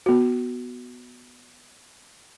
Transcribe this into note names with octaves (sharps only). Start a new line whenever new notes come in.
B3 F#4